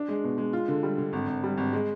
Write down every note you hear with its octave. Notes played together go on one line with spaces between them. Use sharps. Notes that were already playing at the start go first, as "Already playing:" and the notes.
Already playing: D4
G#3
B2
G#3
F4
D3
G3
D3
G#1
G#1
G3
G#1
G#3